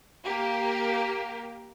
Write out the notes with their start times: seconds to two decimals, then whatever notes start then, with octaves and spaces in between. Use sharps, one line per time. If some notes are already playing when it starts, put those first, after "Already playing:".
0.24 A#3 G4 A#4